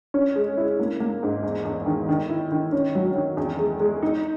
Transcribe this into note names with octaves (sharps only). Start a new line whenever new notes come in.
C#4
G#3
E4
A#3
A#3
G#2
E2
E2
D#3
D#3
E4
D#3
C#4
F#3
D#3
E2
G#3
G#3
D#4